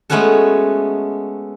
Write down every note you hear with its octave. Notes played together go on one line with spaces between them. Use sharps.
G#3 A3 B3 C#4 F#4 A4